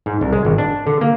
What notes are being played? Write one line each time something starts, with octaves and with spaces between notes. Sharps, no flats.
G#2
C2
G#3
G#1
D4
D3
A#3